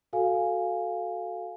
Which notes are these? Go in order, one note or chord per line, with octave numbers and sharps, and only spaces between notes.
F#4 A4 F5 G#5